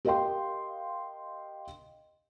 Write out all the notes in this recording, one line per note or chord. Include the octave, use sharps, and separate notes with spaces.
G4 A#4 D#5 F5 G5 C6